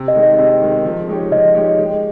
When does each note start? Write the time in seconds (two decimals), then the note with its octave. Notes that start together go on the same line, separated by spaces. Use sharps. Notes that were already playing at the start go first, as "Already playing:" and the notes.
Already playing: C3
0.08 D#5
0.15 D#3 G#3 D#4
0.23 D#5
0.38 C3 D#5
0.61 D#3 G#3 D#4
0.85 F3
1.08 G#3 D#4 G4 C#5
1.31 F3 D#5
1.54 G#3 D#4 G4 C#5
1.78 G#3